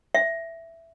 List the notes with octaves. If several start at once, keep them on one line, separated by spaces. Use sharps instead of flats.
E5